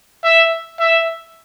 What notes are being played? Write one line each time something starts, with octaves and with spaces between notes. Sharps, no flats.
E5
E5